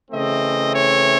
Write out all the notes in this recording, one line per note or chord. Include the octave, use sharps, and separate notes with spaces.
C#3 E3 A3 C4 D#5
C#5